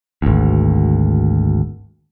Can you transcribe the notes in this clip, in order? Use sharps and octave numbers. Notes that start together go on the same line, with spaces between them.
G#1 D2